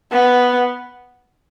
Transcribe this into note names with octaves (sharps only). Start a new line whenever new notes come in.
B3